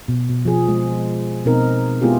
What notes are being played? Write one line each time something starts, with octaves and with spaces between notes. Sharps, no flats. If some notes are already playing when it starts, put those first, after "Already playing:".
B2
B2
F3 G#4
G#3
B2 C4 D#4 A#4
G#3 B3 E4 F4 G4 G#4